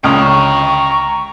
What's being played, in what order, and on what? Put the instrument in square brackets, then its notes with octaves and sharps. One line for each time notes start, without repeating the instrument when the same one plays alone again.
[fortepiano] C#2 D#6 [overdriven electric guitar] G5 A#5 [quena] C#6